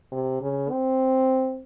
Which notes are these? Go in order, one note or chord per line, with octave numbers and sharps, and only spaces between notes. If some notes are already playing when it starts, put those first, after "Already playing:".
C3
C#3
C4